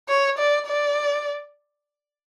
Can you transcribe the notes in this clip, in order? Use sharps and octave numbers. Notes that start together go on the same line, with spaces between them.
C#5
D5
D5